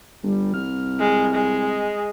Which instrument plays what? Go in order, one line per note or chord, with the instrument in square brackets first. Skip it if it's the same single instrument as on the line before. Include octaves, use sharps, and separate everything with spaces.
[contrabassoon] G1 [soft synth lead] G3
[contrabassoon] C2 [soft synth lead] F6
[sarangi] G#3
G#3
[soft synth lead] D#5